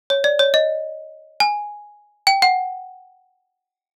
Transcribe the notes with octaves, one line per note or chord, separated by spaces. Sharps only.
C#5
D5
C#5
D#5
G#5
G5
F#5